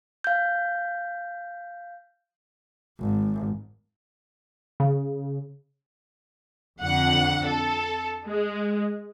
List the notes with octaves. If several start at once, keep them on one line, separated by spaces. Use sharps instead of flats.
F5 G6
G#1
C#3
F2 D3 F#5
A4
G#3